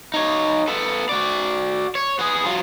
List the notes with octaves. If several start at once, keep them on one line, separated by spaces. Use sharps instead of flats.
D#4 C#5
B3 A4
F#4 D5
C#5
B3 G#4
F#3 F4